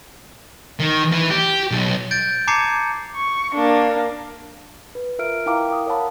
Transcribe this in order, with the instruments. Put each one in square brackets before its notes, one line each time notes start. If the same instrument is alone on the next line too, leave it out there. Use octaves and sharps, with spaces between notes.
[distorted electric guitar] D#3
E3
G4
B1
[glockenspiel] G6 A6 D7
A5 A#5 D6 G#6 C7 C#7
[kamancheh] C#6
A#3 D4
[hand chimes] B4
F4 A#4 E5 F6 D7
E4 A#4 F5 G5 A#5 D6
D#6
A#4 C#5 F5 F#5 A5 B5